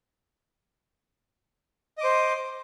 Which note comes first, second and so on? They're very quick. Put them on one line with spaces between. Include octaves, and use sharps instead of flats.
D#5 D6 C5